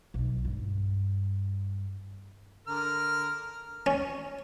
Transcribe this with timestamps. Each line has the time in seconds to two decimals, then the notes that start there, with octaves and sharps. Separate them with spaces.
0.14 B1
0.45 G2
2.67 D3 A#4 F6
3.86 C#4